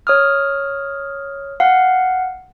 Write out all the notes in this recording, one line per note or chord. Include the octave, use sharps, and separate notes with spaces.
C#5 D#6 F6
F5 F#5